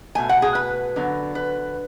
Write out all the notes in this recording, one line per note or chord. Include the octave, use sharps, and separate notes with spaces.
B2 A3 G#5
F#5
G#4
B4
D3 F#3 B3
B4